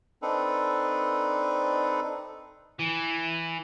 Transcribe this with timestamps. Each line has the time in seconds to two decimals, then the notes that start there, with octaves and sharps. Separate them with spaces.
0.22 C4 D4 D#4 A4 B4
2.79 E3